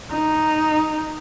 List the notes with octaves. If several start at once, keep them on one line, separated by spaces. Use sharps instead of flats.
D#4